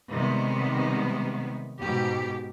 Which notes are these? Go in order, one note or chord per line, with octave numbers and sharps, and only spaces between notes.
C3 D#3 G3 G#3 B3
G#2 B2 G4